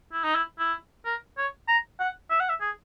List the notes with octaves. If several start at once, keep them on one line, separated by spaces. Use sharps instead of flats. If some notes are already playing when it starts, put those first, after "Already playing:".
E4
D#4
E4
E4
A#4
C#5
A#5
F#5
E5
F#5
E5
G#4